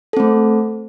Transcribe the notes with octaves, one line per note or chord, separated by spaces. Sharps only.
A3 C4 A4